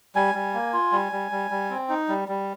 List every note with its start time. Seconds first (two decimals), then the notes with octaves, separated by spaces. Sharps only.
0.16 G3 G#5
0.35 G3
0.54 A#3
0.73 F4
0.92 G3
1.12 G3
1.31 G3
1.51 G3
1.70 C4
1.89 D#4
2.08 G3
2.28 G3